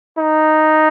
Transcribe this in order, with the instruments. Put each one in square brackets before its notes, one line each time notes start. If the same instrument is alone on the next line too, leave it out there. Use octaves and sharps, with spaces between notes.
[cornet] D#4